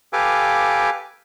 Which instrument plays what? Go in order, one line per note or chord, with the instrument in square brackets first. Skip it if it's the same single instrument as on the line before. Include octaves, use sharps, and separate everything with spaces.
[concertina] G4 A4 B4 F5 G#5 D6